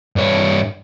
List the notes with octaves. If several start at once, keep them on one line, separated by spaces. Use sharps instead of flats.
G2 C#5